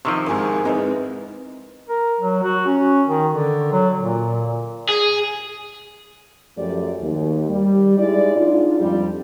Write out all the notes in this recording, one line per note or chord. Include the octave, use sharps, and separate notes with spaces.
C3 D#3 F3 C6 C#6 E6
G#1 G#2 A#4 G#5
G#3 C4 D#4 E4 B4 D#5
A#4
F#3
F#4
C#4
D#3
D3
F#3
A#2
G#4
F#2 F3 A3 G4 D5
D#2
G3
G#3 D#4 E4 D5
G#2 D4 D#4 F4
F2 G3